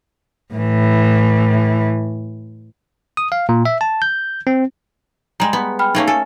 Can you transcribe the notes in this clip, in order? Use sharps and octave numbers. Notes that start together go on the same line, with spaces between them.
A2 E3
D#6
F5
A#2
E5
A5
G6
C4
G3 G#3 A#5
B3
G5 B5 F6
A3 A#3 C#4 D#4
A4 G#5